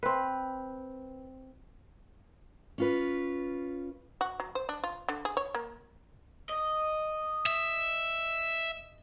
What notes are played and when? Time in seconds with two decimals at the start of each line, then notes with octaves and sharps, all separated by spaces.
0.03 C4 B4
2.78 C#4 F4 B4
4.21 F#4
4.40 F#3
4.55 C5
4.69 D4
4.84 F4
5.08 D3
5.25 G#4
5.37 C#5
5.54 A#3
6.49 D#5
7.46 E5